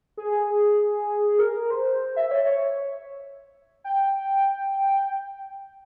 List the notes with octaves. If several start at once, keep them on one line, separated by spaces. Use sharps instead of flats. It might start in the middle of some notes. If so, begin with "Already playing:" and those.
G#4
A#4
C5
E5
C#5
C#5
G5